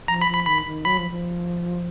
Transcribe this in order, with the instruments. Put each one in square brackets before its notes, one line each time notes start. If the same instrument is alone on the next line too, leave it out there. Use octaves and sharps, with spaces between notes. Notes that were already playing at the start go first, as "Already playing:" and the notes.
[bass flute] F3 [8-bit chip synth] A#5
[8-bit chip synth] B5
[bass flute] F3
[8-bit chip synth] B5
[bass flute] D#3 [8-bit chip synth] B5
[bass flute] D#3
[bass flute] F#3 [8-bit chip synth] B5
[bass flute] F3
F3